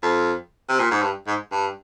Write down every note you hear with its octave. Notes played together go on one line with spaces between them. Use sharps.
F2
C3
A#2
G#2
G2
G#2
G2